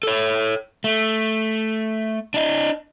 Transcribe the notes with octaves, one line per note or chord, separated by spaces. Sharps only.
A4 C#5
A3
D4 D#5